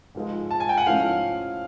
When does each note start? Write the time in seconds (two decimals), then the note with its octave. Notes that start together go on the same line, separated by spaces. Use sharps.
0.15 G#2 F3 G#3
0.51 A5
0.60 G#5
0.69 G5
0.77 F#5
0.87 G#2 F3 A3 C#4 E4 F5